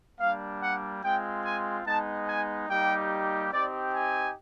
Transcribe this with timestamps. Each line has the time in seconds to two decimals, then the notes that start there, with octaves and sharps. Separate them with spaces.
0.18 G3 A#3 D4 F5
0.61 F#5
1.02 G#3 C4 F4 G5
1.44 G#5
1.85 G#3 B3 D#4 A5
2.28 G#5
2.68 G3 A#3 D#4 G4 G5
3.51 C4 D#4 G4 D5
3.93 G#5